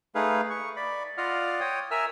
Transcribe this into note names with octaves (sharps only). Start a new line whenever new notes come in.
A3 D#4 G#4 B4 F5
C#6
D5 B5
F4 D5 D#5 F5 F#5 F6
C#5 G5 D#6
A#4 E5 G#5 E6 F6